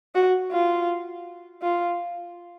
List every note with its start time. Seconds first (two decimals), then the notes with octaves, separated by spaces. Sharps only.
0.15 F#4
0.52 F4
1.62 F4